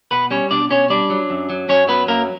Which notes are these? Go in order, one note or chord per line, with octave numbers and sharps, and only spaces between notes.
B2 B3 B4
G3 C#4 C#5
B2 D4 D5
B2 C#4 C#5
G3 D4 D5
F#3
F#2
F#3
F#2 C#4 C#5
F#3 B3 B4
F#2 A#3 A#4